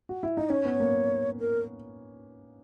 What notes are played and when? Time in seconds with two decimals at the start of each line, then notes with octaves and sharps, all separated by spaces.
0.09 F#4
0.23 E4
0.37 D#4 D#5
0.50 C#4 C#5
0.65 B3
0.80 A#3
1.40 A#4